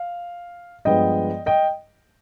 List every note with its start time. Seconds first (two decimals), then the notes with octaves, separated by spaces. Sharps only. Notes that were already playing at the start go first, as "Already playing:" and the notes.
Already playing: F5
0.85 G2 F3 G#3 B3 D#5 G5
1.46 D#5 G5